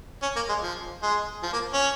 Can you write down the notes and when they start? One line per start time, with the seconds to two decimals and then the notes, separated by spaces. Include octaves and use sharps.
0.22 C#4
0.36 A#3
0.49 G#3
0.63 F3
1.02 G#3
1.43 F3
1.53 A#3
1.73 C#4